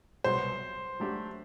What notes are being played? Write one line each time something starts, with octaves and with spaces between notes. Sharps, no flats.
C2 B2 F#3 B3 C5
F#3 A3 D4 G4